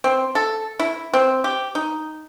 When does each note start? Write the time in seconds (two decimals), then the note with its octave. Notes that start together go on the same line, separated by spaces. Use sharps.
0.04 C4
0.35 A4
0.79 E4
1.14 C4
1.44 G4
1.75 D#4